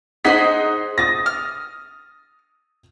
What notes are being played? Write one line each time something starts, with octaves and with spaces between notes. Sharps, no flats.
D#4 G#4 C5 D#5 F#5 B6
D#6 A6 A#6
F6